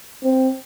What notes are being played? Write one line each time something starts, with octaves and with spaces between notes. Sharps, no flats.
C4